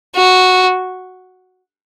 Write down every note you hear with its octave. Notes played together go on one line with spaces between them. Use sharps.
F#4